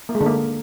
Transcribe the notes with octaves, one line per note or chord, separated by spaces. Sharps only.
A#3
G#3
D3
A#3